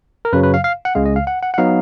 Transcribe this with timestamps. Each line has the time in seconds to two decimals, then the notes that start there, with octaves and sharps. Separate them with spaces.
0.25 A#4
0.33 F#2 C#3 F#3 B4
0.43 B4
0.54 F5
0.64 F5
0.85 F#5
0.95 C#2 C#3 G#3 F5
1.06 D#5
1.16 F5
1.27 F#5
1.43 F#5
1.54 F#5
1.58 F#3 B3 D#4 F5